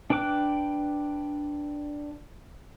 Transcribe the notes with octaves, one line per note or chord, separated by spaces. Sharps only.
D4 B4 G5 D6 F#6